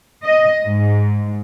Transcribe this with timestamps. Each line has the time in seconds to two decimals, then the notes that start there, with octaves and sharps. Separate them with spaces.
0.24 D#5
0.64 G#2